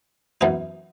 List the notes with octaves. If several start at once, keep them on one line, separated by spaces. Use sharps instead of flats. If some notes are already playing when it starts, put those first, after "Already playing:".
F#2 E3 B3 D#4